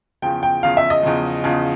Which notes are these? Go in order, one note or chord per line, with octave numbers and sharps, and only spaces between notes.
E2 C#3 F3 G5
G5
E2 C#3 F3 F5
E5
D#5
E2 C#3 F3
E2 C#3 F3